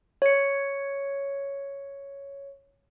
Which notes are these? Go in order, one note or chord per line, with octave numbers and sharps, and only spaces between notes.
C#5 C#7